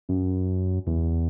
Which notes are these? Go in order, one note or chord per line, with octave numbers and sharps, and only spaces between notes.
F#2
E2